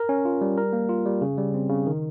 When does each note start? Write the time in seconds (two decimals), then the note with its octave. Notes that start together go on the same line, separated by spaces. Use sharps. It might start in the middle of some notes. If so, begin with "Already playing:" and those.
Already playing: A#4
0.09 C#4
0.25 F4
0.41 G3
0.58 A#4
0.73 A#3
0.89 F4
1.06 G3
1.22 C#3
1.38 G3
1.54 C4
1.69 C#3
1.86 D#3